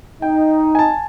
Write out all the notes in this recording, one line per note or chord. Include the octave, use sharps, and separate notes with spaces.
D#4 G5
G#5 A5